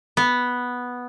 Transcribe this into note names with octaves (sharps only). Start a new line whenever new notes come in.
B3